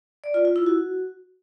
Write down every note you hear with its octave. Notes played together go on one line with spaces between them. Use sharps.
D5
F4
F4
E4
F#4